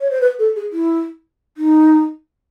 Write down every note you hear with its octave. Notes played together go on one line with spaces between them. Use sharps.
C#5
C5
B4
A4
G#4
E4
D#4